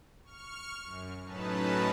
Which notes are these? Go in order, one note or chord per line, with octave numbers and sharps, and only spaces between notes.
C#6 F6
F#2
A2 F#3 C#4 D#4 B4 A5